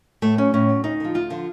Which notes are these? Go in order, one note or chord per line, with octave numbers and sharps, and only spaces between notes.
A2 A3
F#3 C#4
A2 C#4
F#3
D2 D#4
D3 F3
D2 F4
D3 F3